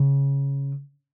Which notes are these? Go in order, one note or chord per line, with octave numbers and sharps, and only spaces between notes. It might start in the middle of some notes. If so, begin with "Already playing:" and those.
Already playing: C#3